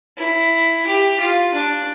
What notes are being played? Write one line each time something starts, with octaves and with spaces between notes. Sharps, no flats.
E4
G4
F4
D4